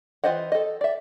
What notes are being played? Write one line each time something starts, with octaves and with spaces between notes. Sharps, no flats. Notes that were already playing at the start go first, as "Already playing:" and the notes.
E3 F4 C5 D#5 F#5
A4 D#5
D5 E5